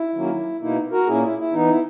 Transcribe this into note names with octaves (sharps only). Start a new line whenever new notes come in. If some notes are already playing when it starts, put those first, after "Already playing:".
Already playing: E4
D#3 F#3 A#3 C#4
B2 A#3 D#4 E4
F#4 A#4
A#2 A#3 C#4 E4 G#4
E4
E4
E3 B3 D#4
E4